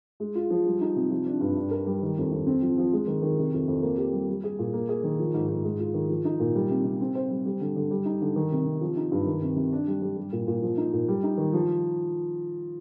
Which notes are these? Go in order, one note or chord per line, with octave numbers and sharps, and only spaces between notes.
G#3
F4
F3
G3
D#4
C3
F3
D4
G2
D4
A#4
G3
D#3
F2
F2
C4
F3
F3
G#3
D#3
D#3
C3
F2
F2
A#3
G4
G3
G3
G#4
A#2
A#3
G#4
D#3
F3
G#2
G#2
G#3
F4
D#3
F3
D#4
A#2
G3
C3
C3
C4
C5
G3
G3
D3
D3
G3
D#4
D3
D#3
C3
C3
F3
D#4
G2
D#3
C3
C3
D4
G3
G3
G3
A#2
A#2
F3
D#4
A#2
G3
D#4
D#3
F3